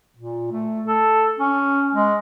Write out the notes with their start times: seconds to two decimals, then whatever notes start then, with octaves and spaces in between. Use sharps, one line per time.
0.16 A#2
0.51 A3
0.87 A4
1.39 C#4
1.94 G#3